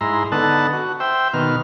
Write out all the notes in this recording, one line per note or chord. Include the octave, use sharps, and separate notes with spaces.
G#2 E4 A#5 C6
D3 B3 D#4 A4 F#5 A5
F#4
C5 E5 G5
B2 D#3 F6